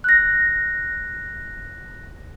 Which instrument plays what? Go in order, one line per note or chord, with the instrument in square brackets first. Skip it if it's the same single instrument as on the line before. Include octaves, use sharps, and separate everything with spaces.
[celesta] F#6 A#6